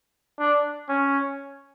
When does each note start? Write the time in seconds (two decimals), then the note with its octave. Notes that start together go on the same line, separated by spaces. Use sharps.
0.39 D4
0.89 C#4